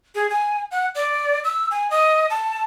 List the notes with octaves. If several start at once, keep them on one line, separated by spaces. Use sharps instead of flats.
G#4
G#5
F#5
D5
E6
G#5
D#5
A5